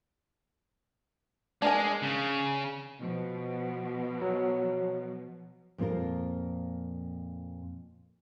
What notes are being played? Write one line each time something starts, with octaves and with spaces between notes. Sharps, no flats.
G#3 D4 A#4 G#5
C#3
B2 F3
F#3
F2 A#2 C4 F4 A#4